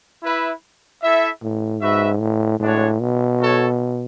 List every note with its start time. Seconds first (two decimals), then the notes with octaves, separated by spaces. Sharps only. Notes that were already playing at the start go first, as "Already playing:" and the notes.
0.23 E4 B4 E5
1.02 E4 A4 E5
1.42 A2
1.81 G#2 F#4 B4 E5
2.20 A2
2.60 A2 G#3 D4 F#4 C#5
3.00 B2
3.39 F#4 A4 C#5